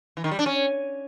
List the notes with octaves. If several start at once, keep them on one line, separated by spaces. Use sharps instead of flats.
E3
D#3
G3
D4
C#4